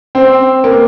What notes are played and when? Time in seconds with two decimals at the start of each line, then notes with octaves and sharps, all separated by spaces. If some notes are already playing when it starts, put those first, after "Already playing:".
0.15 C4
0.64 A#3